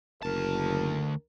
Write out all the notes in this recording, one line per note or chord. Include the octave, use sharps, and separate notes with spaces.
F#1 D2 A#4 A5